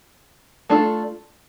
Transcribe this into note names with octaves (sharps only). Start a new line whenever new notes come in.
A3 D4 F4 A4